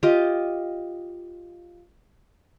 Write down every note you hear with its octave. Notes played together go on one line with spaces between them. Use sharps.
F4 G4 D#5